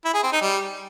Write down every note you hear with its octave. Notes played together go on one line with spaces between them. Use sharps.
E4
G#4
C4
D#4
G3